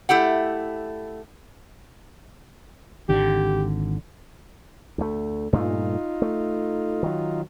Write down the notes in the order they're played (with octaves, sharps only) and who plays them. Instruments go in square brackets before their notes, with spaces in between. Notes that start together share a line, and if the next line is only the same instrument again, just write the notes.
[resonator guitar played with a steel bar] A3 E4 G4 F#5
[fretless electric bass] G#1 D3 [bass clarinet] G4
[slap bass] D2 A3
[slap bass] G2 A#2 A3 [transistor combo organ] D#4 F4
[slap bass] A3
D#3 F#3